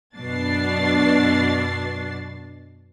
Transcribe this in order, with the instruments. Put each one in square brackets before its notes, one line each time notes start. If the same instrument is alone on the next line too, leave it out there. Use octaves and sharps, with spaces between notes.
[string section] F#2 B2 D4 A6 C7